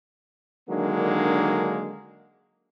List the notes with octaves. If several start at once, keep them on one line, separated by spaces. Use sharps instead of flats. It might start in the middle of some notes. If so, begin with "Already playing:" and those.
D3 D#3 F#3 G#3 A#3 D4